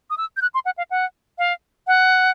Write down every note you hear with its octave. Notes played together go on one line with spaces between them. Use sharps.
D#6
E6
G6
F#6
C6
F#5
F5
F#5
F5
F#5